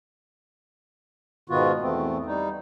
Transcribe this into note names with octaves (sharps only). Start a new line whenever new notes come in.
G#2 B2 D#3 B3 F4 F#4
E2 A3 B3 C4
G3 D#4